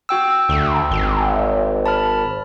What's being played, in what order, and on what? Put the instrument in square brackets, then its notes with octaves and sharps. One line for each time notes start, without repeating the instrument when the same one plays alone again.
[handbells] F#4 G5 E6
[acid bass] D2
G#1
[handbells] A5 B5 F6